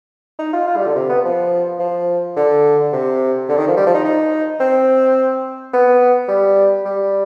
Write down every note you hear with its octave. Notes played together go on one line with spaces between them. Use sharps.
D#4
F4
F4
G3
D3
C3
B3
F3
F3
D3
C3
D3
D#3
F3
G3
F3
D#4
D#4
C4
B3
G3
G3